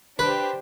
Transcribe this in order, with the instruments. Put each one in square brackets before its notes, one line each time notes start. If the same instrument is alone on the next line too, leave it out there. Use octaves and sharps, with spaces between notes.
[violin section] D4 G4 C5 [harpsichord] B4